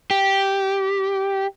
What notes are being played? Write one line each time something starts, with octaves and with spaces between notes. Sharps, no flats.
G4